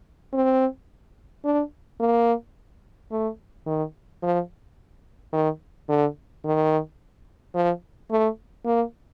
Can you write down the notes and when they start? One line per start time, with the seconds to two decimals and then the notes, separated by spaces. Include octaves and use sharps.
0.33 C4
1.44 D4
2.00 A#3
3.11 A3
3.66 D#3
4.22 F3
5.32 D#3
5.89 D3
6.45 D#3
7.54 F3
8.11 A3
8.65 A#3